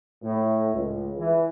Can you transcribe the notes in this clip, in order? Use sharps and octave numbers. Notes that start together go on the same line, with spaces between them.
A2
C#2
E3